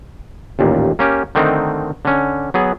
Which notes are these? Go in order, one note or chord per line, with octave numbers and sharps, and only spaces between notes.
A1 D#2 A#2
A#3 C#4 G4
D3 D#3 A3 C4 D#4
D3 C#4
F#3 B3 G#4